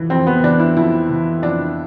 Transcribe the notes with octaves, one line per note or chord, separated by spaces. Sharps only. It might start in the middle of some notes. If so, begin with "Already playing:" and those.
Already playing: F2 E3
F2 C4
B3
E3 D4
E4
F2 E4
E3
F2 D4